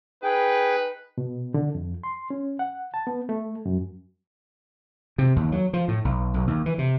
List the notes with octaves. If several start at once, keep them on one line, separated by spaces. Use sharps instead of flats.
D#4 G#4 B4 G5
B2
D3
F2
C6
C#4
F#5
A5
B3
A3
F#2
C3
D#2
F#3
F3
A2
B1
B1
D#2
E3
C3